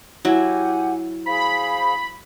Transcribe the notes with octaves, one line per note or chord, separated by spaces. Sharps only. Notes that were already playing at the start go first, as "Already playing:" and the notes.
F#3 E4 G4 F#5 G#5
G#4 C5 F5 B5